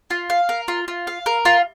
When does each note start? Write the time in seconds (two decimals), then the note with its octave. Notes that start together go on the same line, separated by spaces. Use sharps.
0.10 F4
0.30 F5
0.49 A#4
0.68 F4
0.88 F4
1.07 F5
1.26 A#4
1.45 F4